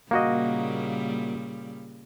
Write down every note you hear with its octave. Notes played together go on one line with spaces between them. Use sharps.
A#2 C#3 G3 A#3 F#4 D#5